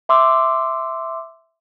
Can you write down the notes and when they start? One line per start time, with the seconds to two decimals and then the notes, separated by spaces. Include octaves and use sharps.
0.09 E5 C6 D6 E6